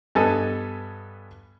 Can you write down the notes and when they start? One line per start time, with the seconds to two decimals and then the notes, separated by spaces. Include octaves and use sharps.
0.15 G2 B3 A4 D#5 G#5 A5